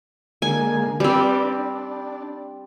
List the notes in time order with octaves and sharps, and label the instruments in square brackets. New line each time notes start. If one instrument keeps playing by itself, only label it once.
[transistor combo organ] D3 G#3 A#3 [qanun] G#5
[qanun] G3 C4 [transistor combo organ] D4 B4 D5
[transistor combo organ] D4